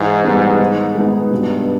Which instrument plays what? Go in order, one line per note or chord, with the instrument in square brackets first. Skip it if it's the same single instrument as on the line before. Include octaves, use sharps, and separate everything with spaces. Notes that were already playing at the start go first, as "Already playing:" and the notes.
Already playing: [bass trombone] G#2 [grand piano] E3
[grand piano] G3 B3 D#4
D#3
G#3 B3 D#4
[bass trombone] G2 [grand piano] B2